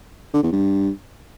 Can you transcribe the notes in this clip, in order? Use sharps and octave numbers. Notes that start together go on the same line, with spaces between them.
D3
E2
G2